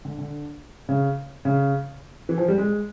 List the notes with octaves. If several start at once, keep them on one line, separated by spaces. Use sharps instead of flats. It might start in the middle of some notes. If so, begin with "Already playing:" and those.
D3
D3
C#3
C#3
E3
F3
G3
G#3